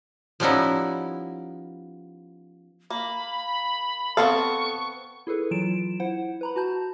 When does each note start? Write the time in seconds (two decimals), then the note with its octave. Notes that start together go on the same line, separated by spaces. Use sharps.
0.40 F3 G3 B3 C#4 D#4 E4
2.90 A#3 B5
4.17 B3 C4 A4 F5 C#6
5.27 E4 G#4 A4 B4
5.51 E3 F#3 F4 D7 E7
6.00 E4 C5 F#5
6.41 B4 A#5 B5
6.56 F#4 A5 G6